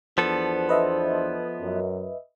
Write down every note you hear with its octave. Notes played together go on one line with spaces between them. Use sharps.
E2 F3 B3 D4 A4 C5
B4 D#5 E5
F#2